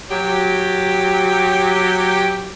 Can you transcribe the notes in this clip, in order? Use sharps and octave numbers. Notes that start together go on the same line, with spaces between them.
F#3 G4